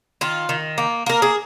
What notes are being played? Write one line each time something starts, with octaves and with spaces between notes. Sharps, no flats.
D#3 F4
D#3
A#3
A#3 A#4
G#4